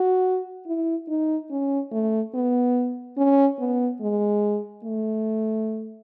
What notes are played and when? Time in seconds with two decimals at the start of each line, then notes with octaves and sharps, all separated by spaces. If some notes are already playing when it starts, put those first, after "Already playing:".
Already playing: F#4
0.66 E4
1.08 D#4
1.50 C#4
1.92 A3
2.34 B3
3.17 C#4
3.59 B3
4.01 G#3
4.84 A3